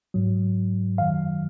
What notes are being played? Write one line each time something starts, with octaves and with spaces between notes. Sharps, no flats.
G#2 F#3
F#2 D#3 F#3 F5